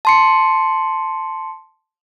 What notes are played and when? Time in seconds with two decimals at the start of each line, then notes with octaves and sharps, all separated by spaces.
0.05 A5 C6 C#7